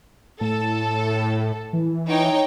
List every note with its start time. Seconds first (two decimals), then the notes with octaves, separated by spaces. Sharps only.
0.41 A2 A4
1.73 E3
2.09 D#4 C#5 G5